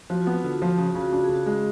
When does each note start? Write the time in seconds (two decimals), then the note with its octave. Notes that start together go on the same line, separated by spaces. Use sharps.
0.10 F3 F#4
0.22 F4
0.27 B3
0.33 D4
0.44 D3 F4
0.62 F3
0.78 C#3 F#4
0.90 F4
0.95 C#3
1.01 F#4
1.12 D4 A4
1.24 G#4
1.29 C#3
1.35 F#4
1.46 G#3 G#4